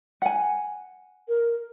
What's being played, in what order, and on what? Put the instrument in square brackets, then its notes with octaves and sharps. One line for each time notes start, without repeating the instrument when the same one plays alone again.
[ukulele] F#5 G#5
[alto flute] A#4